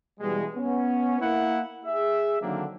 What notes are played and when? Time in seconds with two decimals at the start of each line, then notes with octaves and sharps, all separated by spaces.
0.20 B2 E3 G3 G#3
0.55 B3 C#4
1.21 A#3 E4 F#5
1.86 G#4 E5
2.42 D3 D#3 F#3 A#3 C4 D4